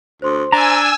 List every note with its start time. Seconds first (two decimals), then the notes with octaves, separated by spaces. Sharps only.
0.22 D2 C5 C6
0.52 D4 G#5 A#5 E6